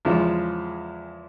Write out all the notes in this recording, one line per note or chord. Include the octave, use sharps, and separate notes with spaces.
E2 C#3 F3 G#3